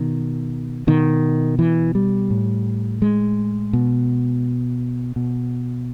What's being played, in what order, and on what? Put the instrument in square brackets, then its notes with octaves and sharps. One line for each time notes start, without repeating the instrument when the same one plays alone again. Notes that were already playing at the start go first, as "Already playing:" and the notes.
Already playing: [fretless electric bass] B2 D#3
B2 D#3
E3
G3
A2
G#3
B2
B2